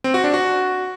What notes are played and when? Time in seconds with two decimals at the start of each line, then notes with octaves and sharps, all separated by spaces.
0.04 C4
0.14 F#4
0.24 D4
0.34 F#4